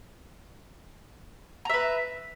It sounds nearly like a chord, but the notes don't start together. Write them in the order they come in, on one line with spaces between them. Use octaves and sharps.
A#5 E5 B4